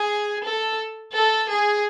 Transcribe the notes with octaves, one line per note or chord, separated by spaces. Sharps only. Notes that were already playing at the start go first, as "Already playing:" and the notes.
Already playing: G#4
A4
A4
G#4